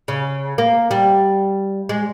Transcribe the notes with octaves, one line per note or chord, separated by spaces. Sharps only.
C#3
A#3
G3
G#3